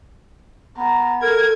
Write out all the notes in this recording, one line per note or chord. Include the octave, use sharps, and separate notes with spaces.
B3 A#5
A4 A#4 G#6